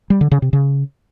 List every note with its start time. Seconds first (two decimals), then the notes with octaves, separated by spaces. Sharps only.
0.10 G3
0.21 D3
0.32 C#3
0.42 C3
0.53 C#3